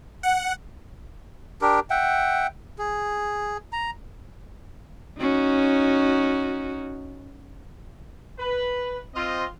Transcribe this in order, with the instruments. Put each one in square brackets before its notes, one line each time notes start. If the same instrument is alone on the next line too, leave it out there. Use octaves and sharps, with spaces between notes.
[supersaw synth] F#5
[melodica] D4 G4 A#4
E5 F#5 G5
G#4
A#5
[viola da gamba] C#4 D#4 F#4
[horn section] B4
C4 F4 D#5